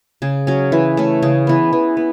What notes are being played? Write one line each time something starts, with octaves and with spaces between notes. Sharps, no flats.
C#3 G#4
F#3 C#4
E3
A3 C#4
C#3 G#4
E3 B3
E3
B3